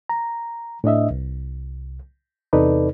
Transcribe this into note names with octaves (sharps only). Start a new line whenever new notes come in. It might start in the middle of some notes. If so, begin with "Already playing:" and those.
A#5
A2 D4 D#5 E5
C2
E2 C3 D#4 A4 B4 D5